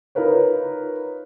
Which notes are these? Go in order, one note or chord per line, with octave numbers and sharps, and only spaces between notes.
D#4 F4 A#4 B4 C#5